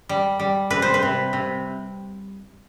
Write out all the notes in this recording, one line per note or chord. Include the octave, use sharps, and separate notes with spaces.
G3
G3
C3 B4
C5
B4
C3
C3